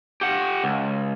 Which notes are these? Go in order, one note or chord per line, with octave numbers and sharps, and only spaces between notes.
G4 F#5
C#2